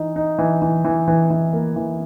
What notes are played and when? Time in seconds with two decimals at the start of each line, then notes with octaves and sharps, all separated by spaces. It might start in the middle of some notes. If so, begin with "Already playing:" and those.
Already playing: E3 D#4
0.16 D#4
0.38 E3
0.62 E3
0.85 E3
1.08 E3
1.30 E3
1.53 A#3
1.76 E3